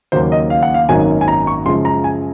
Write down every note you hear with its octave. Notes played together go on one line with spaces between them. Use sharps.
D#2 C#3 F#3 A#3 C5
D#5
F5
F#5
F5
G#1 F#2 D#3 F#3 A#3 G#5
G#5
A#5
C#6
F#2 C#3 F3 G#3 C6
A#5
G#5